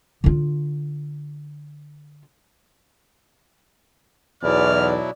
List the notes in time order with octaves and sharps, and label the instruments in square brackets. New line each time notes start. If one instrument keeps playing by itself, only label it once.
[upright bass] D3 F4
[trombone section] B1 E2 [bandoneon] B2 F#3 E4 [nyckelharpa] D5 [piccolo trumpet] F6